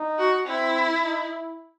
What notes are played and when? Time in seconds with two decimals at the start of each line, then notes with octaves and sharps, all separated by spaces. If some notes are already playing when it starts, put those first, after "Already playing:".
Already playing: D#4
0.19 F#4
0.47 C4 E4
1.03 D#4
1.31 E4